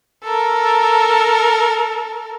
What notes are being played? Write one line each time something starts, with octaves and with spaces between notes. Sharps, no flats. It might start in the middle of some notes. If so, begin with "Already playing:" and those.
A4 A#4